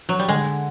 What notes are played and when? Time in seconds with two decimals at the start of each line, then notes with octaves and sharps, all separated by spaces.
0.09 F#3
0.19 G3
0.28 D3 G#3